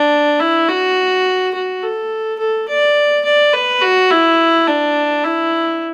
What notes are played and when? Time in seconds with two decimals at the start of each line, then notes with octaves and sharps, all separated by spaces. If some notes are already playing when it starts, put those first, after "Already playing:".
Already playing: D4
0.40 E4
0.69 F#4
1.54 F#4
1.83 A4
2.39 A4
2.68 D5
3.25 D5
3.53 B4
3.82 F#4
4.10 E4
4.67 D4
5.24 E4